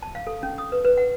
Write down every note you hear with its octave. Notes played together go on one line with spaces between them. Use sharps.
A5
F5
A4
C#4
D#6
B4
B4
F#5